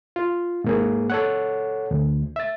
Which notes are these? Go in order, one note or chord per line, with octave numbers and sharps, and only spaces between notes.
F4
G#2 A#3 G#4
A4 C#5 F#5
D2
E5 A6